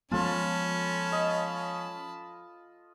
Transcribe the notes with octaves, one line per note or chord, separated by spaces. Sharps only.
F3 G#3 B3 C#4 F4 A4 A5 B5
D#5